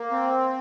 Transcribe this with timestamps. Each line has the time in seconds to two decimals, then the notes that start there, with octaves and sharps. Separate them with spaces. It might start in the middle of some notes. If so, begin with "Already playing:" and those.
Already playing: A#3
0.11 C4